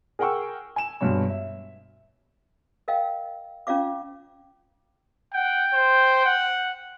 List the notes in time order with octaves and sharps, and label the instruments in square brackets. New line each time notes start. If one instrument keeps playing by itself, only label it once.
[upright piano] G#4 A#4 F#5 G5 C#6 E6
G#5 E7
G2 B2 G#3 C#5
E5
[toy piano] A#4 D#5 F5 G5
C#4 F4 D5 F5 D6
[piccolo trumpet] F#5 [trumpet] G5
[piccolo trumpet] C5
F#5